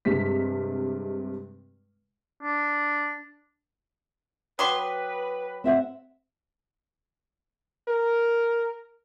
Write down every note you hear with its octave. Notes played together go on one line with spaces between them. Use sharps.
G2 C3 G#3 B6
D4
F#3 B4 G5 C6 D6 D#6
C4 E5 F#5
A#4